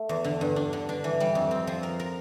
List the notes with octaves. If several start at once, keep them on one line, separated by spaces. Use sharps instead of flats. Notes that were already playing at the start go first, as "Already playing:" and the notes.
Already playing: A3
E2
D3
G2
D4
D3
D4
E3
G3
F2
C4
F3
A#4
A#4